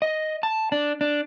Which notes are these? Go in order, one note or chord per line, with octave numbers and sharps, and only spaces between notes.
D#5
A5
D4
D4